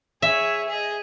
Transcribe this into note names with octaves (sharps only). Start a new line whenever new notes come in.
G#4 C#5 E5
G#4 D#5